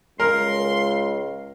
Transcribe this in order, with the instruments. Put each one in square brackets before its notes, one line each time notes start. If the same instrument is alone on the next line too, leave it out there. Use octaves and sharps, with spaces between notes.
[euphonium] C#2 [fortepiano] A#4 [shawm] C6